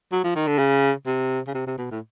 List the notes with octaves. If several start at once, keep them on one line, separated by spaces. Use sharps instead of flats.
F#3
F3
D#3
D3
C#3
C3
C#3
C3
C3
B2
A2